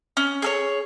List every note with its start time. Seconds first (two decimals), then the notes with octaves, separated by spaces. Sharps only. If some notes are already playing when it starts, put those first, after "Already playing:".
0.17 C#4
0.42 G#4 A4 C#5